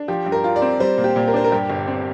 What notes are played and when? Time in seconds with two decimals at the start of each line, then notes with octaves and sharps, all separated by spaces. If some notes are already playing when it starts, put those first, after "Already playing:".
Already playing: D4
0.08 F3 G4
0.26 G2
0.32 A#4
0.44 F4
0.56 D5
0.62 C4
0.80 G3 C5
0.98 A#2
1.04 G4
1.16 A#2
1.28 A#4
1.33 D4 C5
1.44 A#4
1.52 G2 G4
1.70 G1
1.87 C4